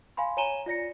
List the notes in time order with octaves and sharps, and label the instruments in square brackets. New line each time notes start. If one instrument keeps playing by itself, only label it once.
[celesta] F5 G#5 B5 C6
C#5 G#5 A#5 D#7 E7 G7
F4 D5 A#6 C#7